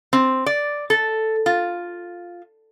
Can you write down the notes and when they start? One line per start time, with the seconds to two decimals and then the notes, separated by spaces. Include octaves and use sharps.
0.13 C4
0.46 D5
0.90 A4
1.46 F4